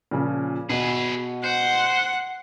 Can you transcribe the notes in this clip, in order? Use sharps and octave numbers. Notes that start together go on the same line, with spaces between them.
A#2 C#3 F3
B2 G#4 B4
C5 F#5